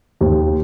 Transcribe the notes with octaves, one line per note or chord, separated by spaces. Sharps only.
D#2